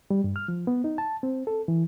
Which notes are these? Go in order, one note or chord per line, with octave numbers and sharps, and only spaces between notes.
G3
G2
F6
F3
B3
D#4
A5
C4
A4
E3